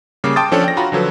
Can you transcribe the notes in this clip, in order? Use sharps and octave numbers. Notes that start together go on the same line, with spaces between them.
C#3 G3 A#3 D6
G5 A5 C6 D6 D#6 A6
F3 C#4 D4 A4 C#5 D5
G5 A#6
F4 F#4 A#5 B5
D3 F3 F#3 A4 B4